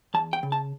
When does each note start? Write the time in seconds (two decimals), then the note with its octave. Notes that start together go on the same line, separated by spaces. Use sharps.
0.14 E2 A5
0.33 G5
0.43 C#3
0.52 A5